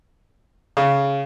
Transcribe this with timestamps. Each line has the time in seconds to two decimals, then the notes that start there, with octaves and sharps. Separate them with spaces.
0.77 C#3